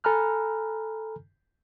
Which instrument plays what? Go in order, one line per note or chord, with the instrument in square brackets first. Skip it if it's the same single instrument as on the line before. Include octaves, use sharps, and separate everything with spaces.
[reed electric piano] A4 G#5 A#5 B5 F6 F#6